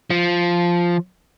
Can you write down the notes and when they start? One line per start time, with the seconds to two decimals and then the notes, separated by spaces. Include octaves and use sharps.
0.10 F3